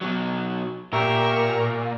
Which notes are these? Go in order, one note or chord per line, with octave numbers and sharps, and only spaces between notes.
B2 F#3
A#2 G4 A#4 E5 C#6